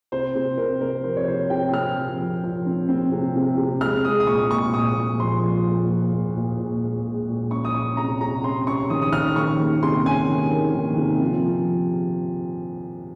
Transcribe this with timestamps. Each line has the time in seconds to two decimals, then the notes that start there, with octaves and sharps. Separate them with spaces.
0.12 C3 C5
0.35 C3
0.58 C3 A#4
0.81 C3 A#4
1.04 F3 C5
1.17 C#5
1.28 C3 C5
1.50 C3 G5
1.73 C3 F6
1.96 F3
2.19 F3
2.43 F3
2.66 C4
2.89 C4
3.12 C3
3.36 C3
3.58 C3
3.81 G#3 F6
4.05 G#3 D#6
4.20 D#6
4.27 A#2 C#6
4.51 A#2 C#6
4.74 A#2 D#6
4.97 A#2
5.20 F3 C6
5.44 F3
5.67 A#2
5.89 F3
6.13 A#2
6.36 A#2
6.58 A#2
6.82 G#3
7.05 G#3
7.28 A#2
7.51 C#4 C#6
7.65 D#6
7.74 C#4 C#6
7.97 C3 A#5
8.21 C3 A#5
8.44 C#4 C6
8.67 C#4 C#6
8.90 D#3 D#6
9.02 D#6
9.13 C#4 F6
9.36 D#3 C#6
9.60 A#3
9.82 C3 C6
10.05 C#4 G#5
10.28 D#3
10.52 A#3
10.74 D#3
10.98 C3
11.21 F3
11.45 F3